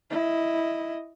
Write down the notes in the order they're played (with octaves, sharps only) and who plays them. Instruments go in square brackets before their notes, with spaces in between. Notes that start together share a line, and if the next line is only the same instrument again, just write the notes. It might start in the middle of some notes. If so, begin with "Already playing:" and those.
[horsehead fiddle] E4 D#5